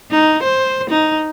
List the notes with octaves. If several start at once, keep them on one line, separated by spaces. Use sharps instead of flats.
D#4
C5
D#4